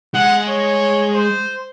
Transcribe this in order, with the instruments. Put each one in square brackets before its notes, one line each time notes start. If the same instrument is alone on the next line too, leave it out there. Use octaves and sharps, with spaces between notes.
[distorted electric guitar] G#3 [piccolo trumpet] F#5
[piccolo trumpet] C#5
C5